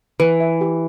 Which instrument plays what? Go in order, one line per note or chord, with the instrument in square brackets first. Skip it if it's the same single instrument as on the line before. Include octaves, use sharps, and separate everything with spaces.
[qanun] E3 [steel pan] B4
[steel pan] E5
G4